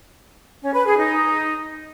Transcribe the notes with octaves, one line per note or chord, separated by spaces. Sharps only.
C#4
B4
G#4
D#4